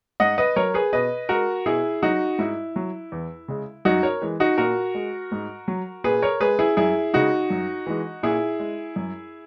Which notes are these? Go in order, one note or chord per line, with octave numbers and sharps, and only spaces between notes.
G#2 D#5 F#5
B4 D#5
F#3 A#4 C#5
G#4 B4
B2 B4 D#5
G#3 F#4 A#4
B2 E4 G#4
F#3 D#4 F#4
G#2 E4
F#3
E2
C#3 G#3
F#2 D#4 F#4
A#4 C#5
E3 G#3
D#4 F#4
A#2 F#4 A#4
G#3
G#2
F#3
A#2 G#4 B4
A#4 C#5
G#3 G#4 B4
E4 G#4
F#2 E4 G#4
C#3 G#3 D#4 F#4
F#2
E3 G#3
A#2 E4 G#4
G#3
F#2